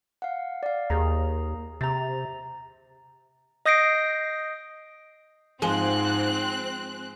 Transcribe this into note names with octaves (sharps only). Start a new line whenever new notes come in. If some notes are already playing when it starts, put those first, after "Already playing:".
F5 F#5
D5 F5
D#2 A#3 G#4 A#5
C3 A#5 A6
D#5 D#6 G6 A#6 C7 D7
G#2 F3 G#3 C4 G#5 F#6 G7